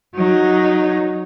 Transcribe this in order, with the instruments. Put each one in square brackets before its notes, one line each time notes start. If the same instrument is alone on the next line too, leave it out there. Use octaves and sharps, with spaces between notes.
[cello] F#3 D#4